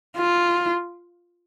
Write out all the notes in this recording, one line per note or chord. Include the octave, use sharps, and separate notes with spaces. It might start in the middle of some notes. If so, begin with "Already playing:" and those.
F4